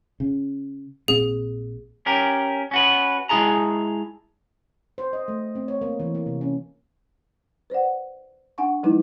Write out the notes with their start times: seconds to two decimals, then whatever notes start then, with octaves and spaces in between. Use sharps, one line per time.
0.20 C#3
1.08 A#1 A#2 C4 G#4
2.06 C#4 G4 A#4
2.71 C#4 F#4 B4
3.29 G#3 B3 E4 G#4 A5 A#5
4.98 C5
5.13 D#5
5.28 A3
5.55 C4
5.68 C#5
5.81 A#3
6.00 E3
6.15 A#3
6.26 C3
6.41 C#4
7.70 B4 C5 D5 F#5
8.58 D4 F#5 G#5 C#6
8.83 F3 F#3 G#3 D#4 E4 B4